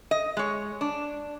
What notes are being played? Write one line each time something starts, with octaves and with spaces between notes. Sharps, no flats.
D#5
G#3 C#5
D4